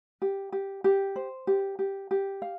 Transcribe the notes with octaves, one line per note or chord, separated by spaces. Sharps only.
G4
G4
G4
C5
G4
G4
G4
F5